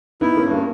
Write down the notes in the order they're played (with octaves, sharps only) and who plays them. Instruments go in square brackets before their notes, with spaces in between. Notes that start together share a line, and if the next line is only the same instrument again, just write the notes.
[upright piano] B3 D#4 [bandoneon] E4
[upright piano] A#3 C#4
[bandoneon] G2
[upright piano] A#3